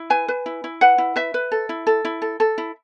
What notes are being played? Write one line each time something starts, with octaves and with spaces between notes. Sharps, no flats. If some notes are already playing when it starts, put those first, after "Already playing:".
Already playing: E4
B4 G#5
B4
E4
E4
B4 F#5
E4
B4 E5
B4
A4
E4
A4
E4
A4
A4
E4